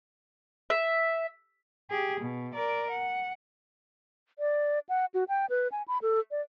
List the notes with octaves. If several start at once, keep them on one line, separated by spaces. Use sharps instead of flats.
E5
G4 G#4
B2
A#4 D5
F#5
D5
F#5
F#4
G5
B4
G#5
B5
A4
D5